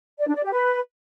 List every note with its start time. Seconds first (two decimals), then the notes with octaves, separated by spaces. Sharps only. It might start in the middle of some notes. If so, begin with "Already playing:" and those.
0.19 D5
0.27 D4
0.36 D5
0.44 G4
0.52 B4